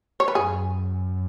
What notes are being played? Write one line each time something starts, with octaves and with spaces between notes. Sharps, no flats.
C#5
B4
F#2 G#4